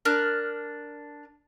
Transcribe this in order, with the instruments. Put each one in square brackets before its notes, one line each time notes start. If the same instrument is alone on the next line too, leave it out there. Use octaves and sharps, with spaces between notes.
[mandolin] D4 A#4 F6 F#6